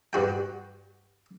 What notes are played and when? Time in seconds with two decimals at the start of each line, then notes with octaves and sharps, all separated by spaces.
0.13 G2 F#4 G5